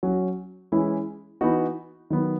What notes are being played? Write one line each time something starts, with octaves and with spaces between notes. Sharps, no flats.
F#3 C#4 F#4
E3 G#3 C#4 E4
E3 B3 D#4 F#4
D#3 F#3 B3